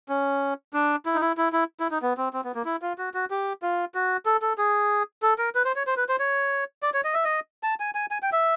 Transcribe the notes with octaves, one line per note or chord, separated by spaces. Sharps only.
C#4
D4
E4
D#4
E4
E4
E4
E4
D#4
B3
C4
C4
B3
A#3
E4
F4
F#4
F#4
G4
F4
F#4
A4
A4
G#4
A4
A#4
B4
C5
C#5
C5
B4
C5
C#5
D5
C#5
D#5
E5
D#5
A5
G#5
G#5
G#5
G5
E5